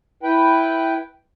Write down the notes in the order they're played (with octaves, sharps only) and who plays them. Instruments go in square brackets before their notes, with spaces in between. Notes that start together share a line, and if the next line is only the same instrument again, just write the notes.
[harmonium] E4 B4 G5